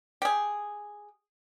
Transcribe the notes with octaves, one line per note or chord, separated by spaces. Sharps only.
G4 G#4